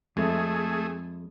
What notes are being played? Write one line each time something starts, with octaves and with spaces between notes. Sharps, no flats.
F2 G#3 A3 G#4 A4 E5